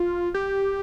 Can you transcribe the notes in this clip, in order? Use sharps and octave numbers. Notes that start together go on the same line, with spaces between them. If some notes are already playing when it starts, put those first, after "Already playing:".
Already playing: F4
G4